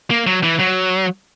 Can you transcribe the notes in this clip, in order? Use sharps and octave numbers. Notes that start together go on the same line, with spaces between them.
A#3
F#3
E3
F#3